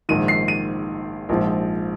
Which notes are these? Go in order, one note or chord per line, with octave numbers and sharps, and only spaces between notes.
A#1 G#2 D#3 D#7
C7
D#7
A#1 G#2 F3